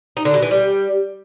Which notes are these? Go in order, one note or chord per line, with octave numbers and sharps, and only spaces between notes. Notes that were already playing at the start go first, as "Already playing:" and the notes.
D#4
D3
B2
E3
G3